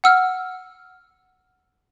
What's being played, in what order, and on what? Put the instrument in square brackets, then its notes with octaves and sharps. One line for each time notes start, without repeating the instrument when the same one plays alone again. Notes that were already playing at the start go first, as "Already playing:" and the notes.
[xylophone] F#5 E6 F6